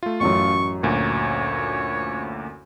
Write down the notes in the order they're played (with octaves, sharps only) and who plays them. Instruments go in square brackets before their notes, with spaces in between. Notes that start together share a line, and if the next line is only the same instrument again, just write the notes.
[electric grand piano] A3 F4
[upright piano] A1 F#2 [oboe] C#6
[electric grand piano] D2 A#2 [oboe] C#5